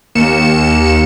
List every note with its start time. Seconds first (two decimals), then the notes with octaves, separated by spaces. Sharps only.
0.15 D#2 C#7 E7